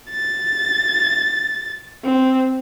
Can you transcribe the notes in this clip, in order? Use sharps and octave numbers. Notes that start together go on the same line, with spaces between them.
A6
C4